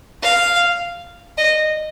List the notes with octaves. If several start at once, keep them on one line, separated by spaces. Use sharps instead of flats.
F5
D#5